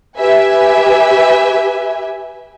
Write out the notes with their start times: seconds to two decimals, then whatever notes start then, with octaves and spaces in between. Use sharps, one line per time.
0.17 G4 B4 E5 G#5